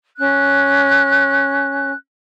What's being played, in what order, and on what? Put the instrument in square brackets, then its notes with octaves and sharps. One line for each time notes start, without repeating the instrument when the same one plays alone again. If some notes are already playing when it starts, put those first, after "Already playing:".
[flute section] C#4 F#6